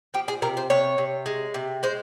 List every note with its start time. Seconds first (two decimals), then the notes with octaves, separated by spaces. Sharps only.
0.14 F3 G4
0.28 G#4
0.42 C3 A#4
0.57 C5
0.70 C3 C#5
0.98 C3
1.26 G#3
1.54 C3
1.83 G#3 C5